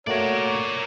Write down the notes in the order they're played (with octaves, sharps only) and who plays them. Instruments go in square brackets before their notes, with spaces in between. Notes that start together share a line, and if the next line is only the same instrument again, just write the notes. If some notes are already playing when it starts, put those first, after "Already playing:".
[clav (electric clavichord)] A3 A#3 F#4 [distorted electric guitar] A#4 D5 [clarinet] C#5